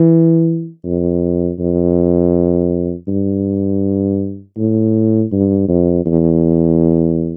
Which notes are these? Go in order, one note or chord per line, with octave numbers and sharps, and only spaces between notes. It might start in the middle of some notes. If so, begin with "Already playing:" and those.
Already playing: E3
F2
F2
G2
A2
G2
F2
E2